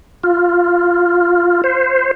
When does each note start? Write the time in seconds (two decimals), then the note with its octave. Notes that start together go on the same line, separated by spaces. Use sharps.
0.23 F4
1.64 C5